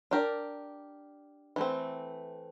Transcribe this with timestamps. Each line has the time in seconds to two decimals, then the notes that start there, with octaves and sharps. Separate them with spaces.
0.11 D4 G4 A#4 D5
1.56 E3 A3 C4